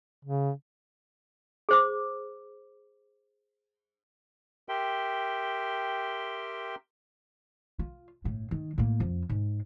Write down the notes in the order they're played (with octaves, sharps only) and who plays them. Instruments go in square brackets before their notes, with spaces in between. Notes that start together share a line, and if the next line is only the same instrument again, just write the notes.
[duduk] C#3
[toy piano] G#4 C5 D6
[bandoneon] G4 A#4 E5 G5 C6
[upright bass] F4
G1 A2
D#3
A2 A#3
F2
G#2